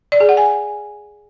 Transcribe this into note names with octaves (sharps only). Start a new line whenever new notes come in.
D5
G#4
F#5
G#5